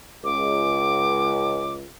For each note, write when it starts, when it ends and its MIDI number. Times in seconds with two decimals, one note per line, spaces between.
0.24 1.85 37
0.24 1.74 86